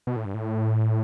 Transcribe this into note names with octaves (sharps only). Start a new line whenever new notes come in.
B2
A2
G2
A2